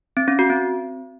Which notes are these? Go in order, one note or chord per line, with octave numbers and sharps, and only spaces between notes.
C4
C#4
F#4
C4